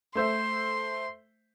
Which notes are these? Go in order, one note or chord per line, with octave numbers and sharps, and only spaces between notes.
A3 C5 E5 C6